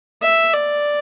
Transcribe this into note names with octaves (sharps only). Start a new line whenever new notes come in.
E5
D5